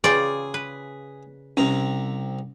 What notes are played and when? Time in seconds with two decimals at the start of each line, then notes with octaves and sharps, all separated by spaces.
0.04 C#3 F4 G#4 D5 G5
0.54 B4
1.57 C2 C4 C#4 A#5